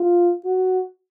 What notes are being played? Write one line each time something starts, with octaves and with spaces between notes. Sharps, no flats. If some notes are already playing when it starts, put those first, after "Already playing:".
Already playing: F4
F#4